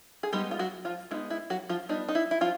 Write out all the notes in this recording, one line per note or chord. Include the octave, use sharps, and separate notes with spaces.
G#4
G3 G#3 B3 D#4 G4
F4
F#3 F#4
F3 F4
G#3 B3 D#4 E4
E4
F#3 F#4
F3 F4
G3 B3 D4 D#4
D#4
E4
E4
F3 F4